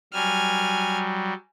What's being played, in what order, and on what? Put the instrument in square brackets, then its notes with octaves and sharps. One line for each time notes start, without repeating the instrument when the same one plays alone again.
[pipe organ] F#3 G3 [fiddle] G#5 F6